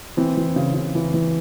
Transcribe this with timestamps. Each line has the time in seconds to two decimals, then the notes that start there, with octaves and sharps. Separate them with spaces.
0.17 E3 C4
0.37 E3
0.56 C#3
0.75 C#3
0.95 E3
1.14 E3